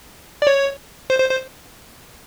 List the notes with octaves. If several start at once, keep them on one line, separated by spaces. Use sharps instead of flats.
D5
C#5
C5
C5
C5